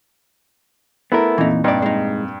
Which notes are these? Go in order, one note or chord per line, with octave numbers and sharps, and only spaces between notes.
A3 B3 E4 A#4
F2 A#2 E3 D#4
G2 D#4 D5
G#3 D#4